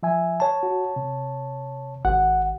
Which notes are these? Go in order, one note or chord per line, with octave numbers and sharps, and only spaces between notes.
F3 E5 G#5
C#5 A5
F#4
C3
G#1 F#5